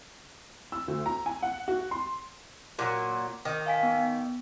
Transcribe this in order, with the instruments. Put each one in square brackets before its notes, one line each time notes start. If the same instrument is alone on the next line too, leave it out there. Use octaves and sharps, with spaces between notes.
[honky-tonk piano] E6
D2
A#5
G#5
F#5
F#4
C6
[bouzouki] A#2 F#3
D#3
[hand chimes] F5 G#5 B6
B3